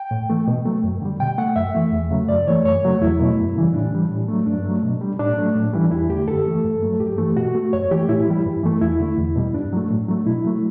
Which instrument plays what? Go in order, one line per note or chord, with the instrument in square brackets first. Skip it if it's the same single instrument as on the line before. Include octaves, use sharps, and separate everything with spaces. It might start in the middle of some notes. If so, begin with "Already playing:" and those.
Already playing: [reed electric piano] G5
A2
E3 A3
B2
F#3 A3
F#2
D3 G3
B2 G5
A3 F#5
F#2 E5
E3 A3
E2
C#3 F#3 A3
F#2 D5
E3 A3 C#5
F#2 C#5
C#3 F#3 A3
E2 E4
B2 F#3 A3
F#2
C#3 E3 G3
A2 D4
E3 G3
A2
F#3 A3
G2 D4
F#3 A3
B2
G3
A2 D4
F#3 A3
A2
E3 G3
E2 E4
D3 A3 G4
F#2 A4
E3 A3
G2
F#3 A3
G2 G4
E3 A3
B2 F#4
A3
F#2 C#5
E3 A3 G4
A2 E4
E3 G3
G2
E3 A3
E2 E4
D3 A3
E2
B2 G3
G2 D4
F#3 A3
A2
F#3 A3
B2 E4
F#3 A3